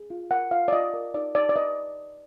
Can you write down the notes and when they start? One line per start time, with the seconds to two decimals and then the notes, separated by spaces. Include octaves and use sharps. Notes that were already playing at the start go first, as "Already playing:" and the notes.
Already playing: G#4
0.10 F4
0.31 A#4 F#5
0.51 F4 F5
0.68 D5
0.72 F4 D#5
0.94 A#4
1.14 D#4 D5
1.35 D#4 D5
1.49 D5
1.56 B4 D#5